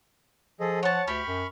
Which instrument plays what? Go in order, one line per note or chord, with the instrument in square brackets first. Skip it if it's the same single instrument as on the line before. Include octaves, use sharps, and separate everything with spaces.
[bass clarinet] F3 [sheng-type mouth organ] G#4 A4 D#5
[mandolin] C#5 A5 [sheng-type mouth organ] F#5
[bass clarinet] D2 [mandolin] G4 [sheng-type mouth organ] B5 C#6 F6
[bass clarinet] F#2